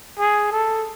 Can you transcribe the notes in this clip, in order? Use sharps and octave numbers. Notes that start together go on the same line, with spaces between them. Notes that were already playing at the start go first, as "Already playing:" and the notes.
G#4
A4